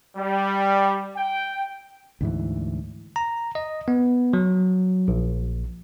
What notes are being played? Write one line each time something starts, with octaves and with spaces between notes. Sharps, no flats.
G3
G5
D2 G#2 E3
A#5
D#5
B3
F#3
A#1